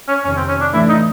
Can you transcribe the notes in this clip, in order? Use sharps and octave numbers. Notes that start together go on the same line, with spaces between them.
C#4
F2 C3 D#3 C#4
C4
C#4
D4
A2 E3 A3 D4 E4
D#4